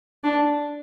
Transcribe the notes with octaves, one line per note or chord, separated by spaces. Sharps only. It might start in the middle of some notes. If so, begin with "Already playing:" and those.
D4